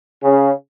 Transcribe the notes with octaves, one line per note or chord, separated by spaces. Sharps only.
C#3